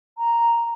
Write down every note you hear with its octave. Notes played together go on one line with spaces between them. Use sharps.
A#5